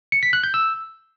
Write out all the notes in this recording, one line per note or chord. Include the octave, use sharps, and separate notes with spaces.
C#7
B6
F#6
G6
E6